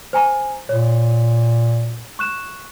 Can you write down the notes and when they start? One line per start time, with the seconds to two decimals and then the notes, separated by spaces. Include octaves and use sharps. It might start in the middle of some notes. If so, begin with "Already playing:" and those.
0.13 C5 G#5 A#5
0.69 A#2 C#5
2.19 C#6 F#6 E7